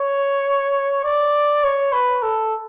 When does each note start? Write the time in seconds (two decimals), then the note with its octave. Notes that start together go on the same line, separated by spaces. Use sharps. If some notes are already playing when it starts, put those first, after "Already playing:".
Already playing: C#5
1.04 D5
1.64 C#5
1.92 B4
2.22 A4